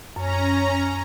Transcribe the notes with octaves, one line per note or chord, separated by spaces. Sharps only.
F#2 C#4 A#5